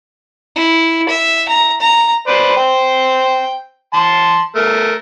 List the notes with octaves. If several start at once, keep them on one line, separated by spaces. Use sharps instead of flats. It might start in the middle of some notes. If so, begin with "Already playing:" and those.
E4
E5
A#5
A#5
B4 C5 D5
C5 G5
A5 C6
A3 A#4